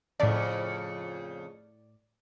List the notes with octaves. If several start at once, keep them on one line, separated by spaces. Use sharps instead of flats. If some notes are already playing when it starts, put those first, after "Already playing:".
F2 A2 C#3 D5